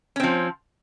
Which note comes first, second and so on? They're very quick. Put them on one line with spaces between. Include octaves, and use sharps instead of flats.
C#4 C4 F3